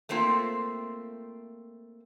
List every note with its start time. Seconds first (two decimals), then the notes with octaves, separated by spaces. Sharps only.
0.09 A3 A#3 C4 F4 E5